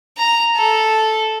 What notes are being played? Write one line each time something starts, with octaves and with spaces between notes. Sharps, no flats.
A#5
A4